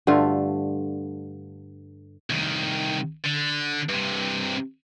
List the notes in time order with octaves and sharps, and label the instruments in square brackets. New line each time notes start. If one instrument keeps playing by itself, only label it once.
[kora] G2 D3 A3 F4
[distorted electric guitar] C2 D#3
D3
G2 C3